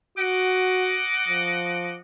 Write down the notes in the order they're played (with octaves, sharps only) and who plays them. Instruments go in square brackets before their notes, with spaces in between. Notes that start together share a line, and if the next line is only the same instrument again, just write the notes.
[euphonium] F#4 [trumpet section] D#5 F#5 D6
[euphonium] F3